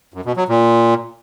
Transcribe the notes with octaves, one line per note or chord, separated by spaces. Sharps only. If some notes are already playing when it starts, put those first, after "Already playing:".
F#2
B2
F#3
A#2